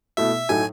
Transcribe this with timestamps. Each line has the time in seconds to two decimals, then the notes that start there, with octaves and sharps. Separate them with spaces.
0.17 B2 A3 E4 E5
0.49 A2 F#3 A3 D#4 G#5